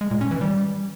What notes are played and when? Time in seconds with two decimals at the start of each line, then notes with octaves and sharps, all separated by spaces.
0.01 G#3
0.11 A#2
0.21 C#4
0.31 E3
0.41 G3